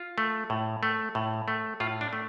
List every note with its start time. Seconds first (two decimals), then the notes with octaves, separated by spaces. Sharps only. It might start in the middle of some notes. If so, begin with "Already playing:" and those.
Already playing: F4
0.18 A3
0.50 A2
0.83 A3
1.15 A2
1.48 A3
1.80 A2 F4
2.01 D4
2.13 A3